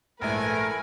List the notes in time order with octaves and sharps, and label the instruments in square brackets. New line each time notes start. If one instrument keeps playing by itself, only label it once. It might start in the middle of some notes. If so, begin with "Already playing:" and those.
[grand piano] A#1 G#2 E4 [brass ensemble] A3 [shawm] A#4 [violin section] B4 G#5